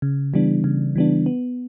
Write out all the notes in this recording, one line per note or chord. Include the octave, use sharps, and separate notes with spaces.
C#3
E3 G3 B3 D4
C#3
E3 G3 B3 D4
B3